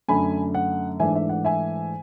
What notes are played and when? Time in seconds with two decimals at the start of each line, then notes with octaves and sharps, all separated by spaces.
0.08 F#2 D3 A3 D4 G#5 B5
0.55 F#5
1.00 G#2 E3 A3 D4 E5 G#5
1.15 E5
1.29 F#5
1.45 E5 G#5